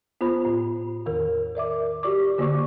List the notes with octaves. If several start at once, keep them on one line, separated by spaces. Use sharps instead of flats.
B3 F4 C5 B5
A2
E2 D#3 A#4
A#4 D5 E5 D6
F#4 G4 D5 C#6 D6
D3 A#3 F#4 D5 C#6 D6